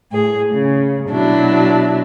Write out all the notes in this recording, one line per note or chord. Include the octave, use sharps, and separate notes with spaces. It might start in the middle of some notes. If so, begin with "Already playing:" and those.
A2 G#4
C#3
B2 F#3 D4 E4